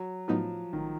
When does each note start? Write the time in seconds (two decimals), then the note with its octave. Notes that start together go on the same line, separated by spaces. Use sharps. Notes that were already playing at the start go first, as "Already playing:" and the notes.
Already playing: F#3
0.28 A2 F3 F#3 B3 D#4
0.73 A1 D#3